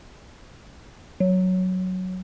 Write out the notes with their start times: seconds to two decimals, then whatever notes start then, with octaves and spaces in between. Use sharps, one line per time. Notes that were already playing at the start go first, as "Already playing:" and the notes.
1.20 F#3